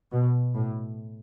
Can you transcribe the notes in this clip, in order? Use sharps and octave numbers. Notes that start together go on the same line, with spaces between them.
B2
A2